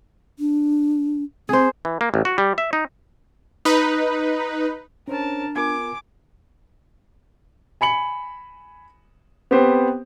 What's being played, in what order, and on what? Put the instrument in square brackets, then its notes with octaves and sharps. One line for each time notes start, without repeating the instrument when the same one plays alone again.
[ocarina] D4
[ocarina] C4 [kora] G#4 C5
[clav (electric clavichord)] E3
A#3
A1
F#4
G3
E5
D#4
[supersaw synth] D#4 B4
[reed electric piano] C#4 C5 C#5 [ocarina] D4 [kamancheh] A#4 A5
[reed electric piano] B3 F4 A#4 [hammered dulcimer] G#5 [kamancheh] D6
[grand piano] G#5 B5 C#7 F#7
B3 C4 G4 B4 C5